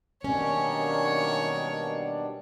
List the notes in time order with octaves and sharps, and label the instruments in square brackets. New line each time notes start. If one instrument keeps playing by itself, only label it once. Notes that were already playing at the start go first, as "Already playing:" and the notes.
[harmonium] B2 G3 D4 [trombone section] D#3 F#3 A#3 [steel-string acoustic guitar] C#4 [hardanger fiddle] C#5